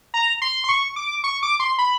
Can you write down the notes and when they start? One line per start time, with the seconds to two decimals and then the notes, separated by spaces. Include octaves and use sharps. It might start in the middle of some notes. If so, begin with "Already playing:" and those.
0.14 A#5
0.42 C6
0.64 C6
0.69 C#6
0.96 D6
1.24 C#6
1.43 D6
1.60 C6
1.79 B5